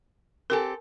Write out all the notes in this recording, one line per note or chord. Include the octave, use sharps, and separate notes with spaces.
C4 G4 A4 A#4 G#5